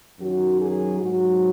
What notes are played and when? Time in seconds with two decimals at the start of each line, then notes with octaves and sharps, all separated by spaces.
0.18 F#2 D#3 F#3 F#4
0.60 G#4
0.99 G#2 F#3 F#4